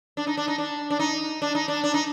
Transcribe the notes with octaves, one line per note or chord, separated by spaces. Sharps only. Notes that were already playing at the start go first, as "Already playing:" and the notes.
D4
D#4
D4
D#4
D4
D4
D#4
D4
D#4
D4
D4
D#4